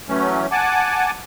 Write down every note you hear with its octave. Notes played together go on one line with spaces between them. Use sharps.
E3 F#3 A3 C#4
F#5 G#5 A5 D6